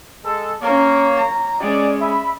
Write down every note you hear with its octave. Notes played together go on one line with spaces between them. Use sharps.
G#3 A4
A#3 C#4 A#4 C#5
A#5
G#3 C#4 D5
E5 B5